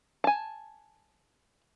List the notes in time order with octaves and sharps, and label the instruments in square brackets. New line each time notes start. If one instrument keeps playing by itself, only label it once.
[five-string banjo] G#5 A5